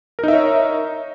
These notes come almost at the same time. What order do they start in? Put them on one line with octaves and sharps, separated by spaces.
A#4 D#4 E5 C#5